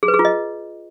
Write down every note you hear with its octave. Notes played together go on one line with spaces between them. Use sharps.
G#4
B4
G#4
F4
D#5